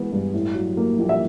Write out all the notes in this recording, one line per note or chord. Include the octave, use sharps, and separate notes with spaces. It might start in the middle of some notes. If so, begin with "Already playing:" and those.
Already playing: E3 G#3 B3
G2
A2
F#3
A#3
A#1
E5